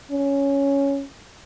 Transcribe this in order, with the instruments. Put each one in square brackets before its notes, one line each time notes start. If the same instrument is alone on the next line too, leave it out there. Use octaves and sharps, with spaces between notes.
[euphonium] C#4